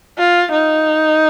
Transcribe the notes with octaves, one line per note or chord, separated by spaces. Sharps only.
F4
D#4